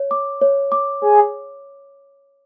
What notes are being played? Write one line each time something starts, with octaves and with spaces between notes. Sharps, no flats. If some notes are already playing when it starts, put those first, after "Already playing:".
Already playing: C#5
D6
C#5
D6
G#4 C#5